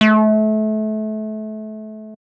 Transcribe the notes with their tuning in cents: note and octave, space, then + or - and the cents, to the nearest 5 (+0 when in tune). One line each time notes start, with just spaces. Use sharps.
A3 -30